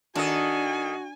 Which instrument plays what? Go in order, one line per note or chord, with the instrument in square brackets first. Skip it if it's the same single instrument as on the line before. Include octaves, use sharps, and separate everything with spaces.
[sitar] D#3 A4 D#5 [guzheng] D4 [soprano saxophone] F#4 [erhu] G#5